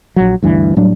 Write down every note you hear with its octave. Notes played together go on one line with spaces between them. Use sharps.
A#1 F#3
D2 G2 E3
A2 F#3 G3 D4